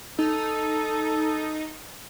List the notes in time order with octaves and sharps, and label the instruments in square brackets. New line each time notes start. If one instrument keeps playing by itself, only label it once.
[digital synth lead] D#4 [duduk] A4